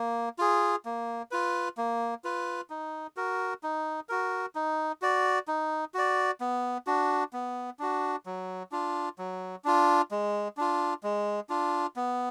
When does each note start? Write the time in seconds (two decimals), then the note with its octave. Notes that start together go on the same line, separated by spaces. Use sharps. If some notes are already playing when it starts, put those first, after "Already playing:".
Already playing: A#3
0.38 F4 G#4
0.85 A#3
1.31 F4 B4
1.77 A#3
2.24 F4 B4
2.70 D#4
3.17 F#4 A#4
3.63 D#4
4.09 F#4 A#4
4.55 D#4
5.02 F#4 D5
5.48 D#4
5.94 F#4 D5
6.41 B3
6.87 D4 F#4
7.33 B3
7.79 D4 F#4
8.26 F#3
8.72 D4 F4
9.19 F#3
9.65 D4 F4
10.11 G#3
10.57 D4 F4
11.03 G#3
11.49 D4 F4
11.96 B3